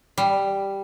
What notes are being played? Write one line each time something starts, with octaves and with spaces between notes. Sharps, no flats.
G3